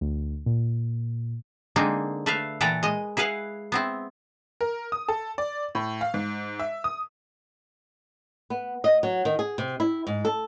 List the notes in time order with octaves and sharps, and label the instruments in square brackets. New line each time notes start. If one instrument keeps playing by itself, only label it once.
[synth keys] D2
A#2
[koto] D3 G#3 A#3 C4 D#4
A3 B4 E5 F5
A#2 E3 A4 B4 G5 A#5
G#3 D#5
E4 G#4 B4 F5 F#5
B3 C4 E4
[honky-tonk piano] A#4
D#6
A4
D5
A2
F5
G#2
E5
D#6
[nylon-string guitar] B3
D#5
F#3
D#3
G#4
C3
E4
G#2
A4